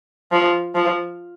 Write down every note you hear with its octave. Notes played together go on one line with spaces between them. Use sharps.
F3
F3